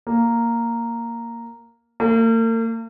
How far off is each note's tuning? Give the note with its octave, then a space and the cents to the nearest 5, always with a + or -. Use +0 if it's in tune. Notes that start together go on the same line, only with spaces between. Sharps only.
A#3 -5
A#3 -45